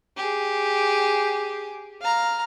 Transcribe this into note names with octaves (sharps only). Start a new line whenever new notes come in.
G4 G#4
F5 A#5